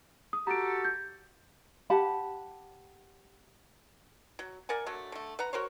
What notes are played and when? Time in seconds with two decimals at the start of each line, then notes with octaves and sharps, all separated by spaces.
0.33 D#6
0.47 F#4 G4 A4 A#5 D7
0.85 G6
1.90 G4 F#5 A5 B5
4.39 F#3
4.69 A#4 D5 F#5 G#5
4.86 D3 F#3 A3
5.12 D3 A3
5.39 B4 F#5 A#5
5.53 F#4 A#4 C5 C#5